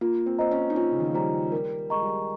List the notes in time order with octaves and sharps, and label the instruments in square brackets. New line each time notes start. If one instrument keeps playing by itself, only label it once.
[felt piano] A#3 [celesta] F4
[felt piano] C4
[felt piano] C4 [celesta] C5 D#5 A#5
[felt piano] C#4
D#4
[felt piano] C#4 [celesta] F4
[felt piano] C#3
D#3
F3
[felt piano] G3 [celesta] C5 D#5 A#5
[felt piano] G3 [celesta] A#4
[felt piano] G#3 [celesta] D#5 A#5 C#6
[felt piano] G3